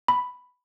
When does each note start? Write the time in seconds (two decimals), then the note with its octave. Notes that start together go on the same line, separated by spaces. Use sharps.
0.08 B5